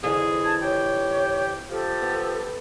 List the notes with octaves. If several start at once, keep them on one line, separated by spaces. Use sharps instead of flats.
F2 D3 E3 G#4
A5 G#6
G4 C#5
F3 G4 A4
B3